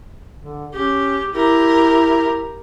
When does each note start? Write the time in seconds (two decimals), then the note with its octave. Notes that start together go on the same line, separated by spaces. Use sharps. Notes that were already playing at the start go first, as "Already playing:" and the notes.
0.40 D3
0.75 C#4 G4
1.34 E4 G4 A#4